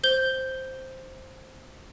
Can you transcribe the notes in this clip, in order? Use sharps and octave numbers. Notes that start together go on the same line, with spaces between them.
C5 G6 G7